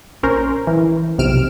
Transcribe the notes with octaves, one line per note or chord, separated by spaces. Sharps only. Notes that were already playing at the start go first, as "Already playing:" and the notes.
A#1 C#4 A#4 C5
E3
B1 F2 C3 F6 D7 E7